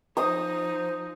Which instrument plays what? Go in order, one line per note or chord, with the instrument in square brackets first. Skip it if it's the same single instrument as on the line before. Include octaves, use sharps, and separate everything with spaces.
[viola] F3 D#4 [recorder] C5 [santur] D#6